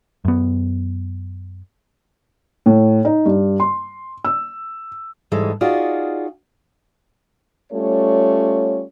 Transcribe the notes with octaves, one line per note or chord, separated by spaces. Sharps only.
F#2 B3
A2
D#4
G2
C6
E6
G#2 E3 G3 G#3 A4
D#4 F4 F#4 G#4 D5
G3 A3 C#4 F4 C#5